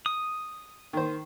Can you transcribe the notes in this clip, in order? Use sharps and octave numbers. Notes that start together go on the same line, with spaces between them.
D#6
D#3 C5